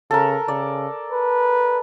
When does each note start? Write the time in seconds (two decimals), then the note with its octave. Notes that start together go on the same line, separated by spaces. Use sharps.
0.11 C#3 A4 A#4
0.48 C#3 D5
1.11 B4